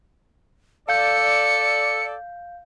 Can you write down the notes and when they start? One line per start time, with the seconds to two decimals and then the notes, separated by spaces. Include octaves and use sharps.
0.89 A4 D5 F5 G6 C#7